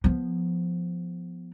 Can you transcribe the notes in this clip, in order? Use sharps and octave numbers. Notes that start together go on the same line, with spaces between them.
F3 B3